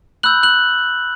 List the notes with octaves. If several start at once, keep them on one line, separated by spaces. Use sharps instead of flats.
B5 E6 F#6 G6 F#7
F#6 F#7